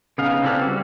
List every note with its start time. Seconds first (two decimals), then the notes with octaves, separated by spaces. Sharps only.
0.18 C#3 B3 D#4 F5
0.43 C4 E4 A4 B4 D5
0.61 G3 F#4